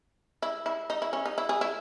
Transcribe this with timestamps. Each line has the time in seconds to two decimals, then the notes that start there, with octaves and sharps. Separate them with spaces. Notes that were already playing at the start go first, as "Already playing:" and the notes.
0.42 E4
0.66 E4
0.90 D#4
1.02 E4
1.13 C#4
1.26 D#4
1.38 E4
1.49 G#4
1.61 E4